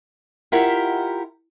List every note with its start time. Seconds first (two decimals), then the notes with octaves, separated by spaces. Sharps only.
0.52 E4 F4 G4 A#4 E5 F#5